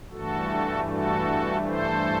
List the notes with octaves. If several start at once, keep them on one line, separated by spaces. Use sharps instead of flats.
G2 E3 A3 F#4 A4
F#4 A4
A4 C5